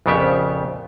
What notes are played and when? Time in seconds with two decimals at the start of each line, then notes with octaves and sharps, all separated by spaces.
0.06 A#1 F2 C#3 B3 G4 E5